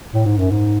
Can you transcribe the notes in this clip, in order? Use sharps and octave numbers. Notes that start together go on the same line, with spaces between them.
A2
G#2
F#2
G#2